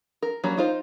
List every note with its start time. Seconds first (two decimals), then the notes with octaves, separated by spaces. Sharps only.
0.22 A#4
0.44 F#3 G3 A#3 C#4
0.57 D#4 F4 C5